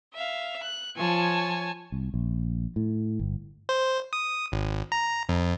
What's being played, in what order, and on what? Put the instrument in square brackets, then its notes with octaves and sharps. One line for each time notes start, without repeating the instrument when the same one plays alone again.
[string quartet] E5 F5
F#6
[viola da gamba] F3 [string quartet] C#5 G#5 A5
[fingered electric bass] C2
A#1
A2
G1
[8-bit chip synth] C5
D#6
G#1
A#5
F2